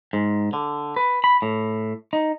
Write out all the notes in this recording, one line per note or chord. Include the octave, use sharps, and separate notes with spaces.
G#2
D3
B4
B5
A2
D#4